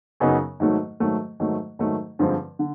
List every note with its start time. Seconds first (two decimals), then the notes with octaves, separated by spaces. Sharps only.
0.20 F#2 C#3 F#3 B3 D#4
0.60 G#2 D#3 F#3 A3
1.00 G#2 D#3 F#3 A3
1.40 G#2 D#3 F#3 A3
1.79 G#2 D#3 F#3 A3
2.19 G2 D3 F3 G#3 C4
2.59 D3